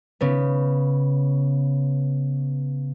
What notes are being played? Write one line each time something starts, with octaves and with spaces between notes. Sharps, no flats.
C#3 B3